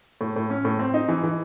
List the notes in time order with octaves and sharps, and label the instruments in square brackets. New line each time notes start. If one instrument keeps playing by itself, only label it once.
[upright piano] A2
A2
C#4
A2
C4
D#4
E3
E3